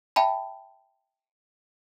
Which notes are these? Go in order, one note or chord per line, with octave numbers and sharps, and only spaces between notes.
E5 G5 A5 B5